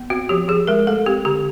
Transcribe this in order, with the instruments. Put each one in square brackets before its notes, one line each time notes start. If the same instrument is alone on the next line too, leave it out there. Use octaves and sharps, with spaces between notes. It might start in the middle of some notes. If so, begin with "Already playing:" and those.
Already playing: [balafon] B3
C4 F#4
F3 G4
F3 G#4
G#3 A#4
A3 A4
C4 G4
D3 G4